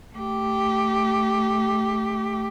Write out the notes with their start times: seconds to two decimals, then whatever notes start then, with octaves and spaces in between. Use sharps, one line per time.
0.16 A3 G4